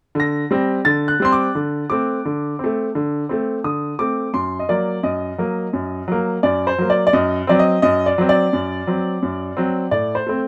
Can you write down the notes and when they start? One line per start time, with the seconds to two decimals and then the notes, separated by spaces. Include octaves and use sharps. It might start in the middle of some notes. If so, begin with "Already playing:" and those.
0.15 D3 A#6
0.51 G3 C4
0.85 D3 A6
1.08 F#6
1.20 G3 C4 C6
1.32 D6
1.55 D3
1.90 A3 C4 D6
2.25 D3
2.59 A3 C4
2.95 D3
3.29 A3 C4
3.64 D3 D#6
3.99 A3 C4 D6
4.34 F#2 C6
4.59 D#5
4.69 F#3 A#3 D5
5.03 F#2 D#5
5.38 F#3 A#3
5.73 F#2
6.08 F#3 A#3
6.43 F#2 D5
6.67 C5
6.78 F#3 A#3
6.90 D5
7.07 D5
7.13 F#2 D#5
7.47 F#3 C4 D5
7.59 D#5
7.82 F#2 D#5
8.06 D5
8.18 F#3 C4
8.29 D5
8.53 F#2
8.87 F#3 C4
9.22 F#2
9.57 F#3 C4
9.91 A2 D5
10.15 C5
10.27 A3 C4